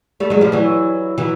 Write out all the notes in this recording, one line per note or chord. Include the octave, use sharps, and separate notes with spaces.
G3 A3
F#3 G#3
F3 G3
E3 F#3
E3 F#3